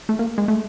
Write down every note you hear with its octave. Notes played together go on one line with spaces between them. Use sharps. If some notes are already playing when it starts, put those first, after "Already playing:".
A3
A#3
G#3
A3